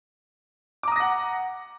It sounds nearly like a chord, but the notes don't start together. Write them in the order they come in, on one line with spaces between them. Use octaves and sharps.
D6 A#5 D#6 A#6 F#5